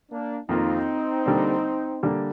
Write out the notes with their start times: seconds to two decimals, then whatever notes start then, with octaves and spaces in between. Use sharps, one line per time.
0.11 A#3 D4
0.49 F2 D#3 A#3 C4 D#4 F4
1.26 D3 G3 A#3 D4
2.03 D3 G3 A#3 D4